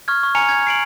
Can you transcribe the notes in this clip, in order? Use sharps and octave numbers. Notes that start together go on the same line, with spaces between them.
C#6 F6 G#6
C#6
G#5 A#5 F6 C#7 F7
G#6
C7 D7 F#7